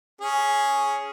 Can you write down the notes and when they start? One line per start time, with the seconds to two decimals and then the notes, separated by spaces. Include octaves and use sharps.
0.21 C#4 G#4